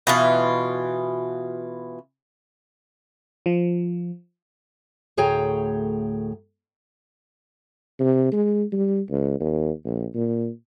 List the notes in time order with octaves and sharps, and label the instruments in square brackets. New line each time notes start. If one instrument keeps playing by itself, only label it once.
[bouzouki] B2 E3 F4
[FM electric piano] F3
[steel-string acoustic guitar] D2 A2 G#4 C#5 G5 A#5
[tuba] C3
G#3
G3
C#2
D#2
A#1
A#2